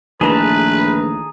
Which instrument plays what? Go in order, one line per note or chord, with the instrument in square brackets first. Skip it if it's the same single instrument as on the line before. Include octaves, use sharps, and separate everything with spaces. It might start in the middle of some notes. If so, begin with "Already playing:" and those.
[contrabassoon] A#1 [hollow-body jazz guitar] D#3 E3 A3 [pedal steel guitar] G#4 A5 A#5 [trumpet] B4